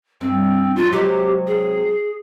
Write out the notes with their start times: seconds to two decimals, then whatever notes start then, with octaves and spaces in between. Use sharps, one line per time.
0.21 G2 C4
0.76 E2 F#3 F4
0.92 C3 F#3 G#3 G4
1.47 G#4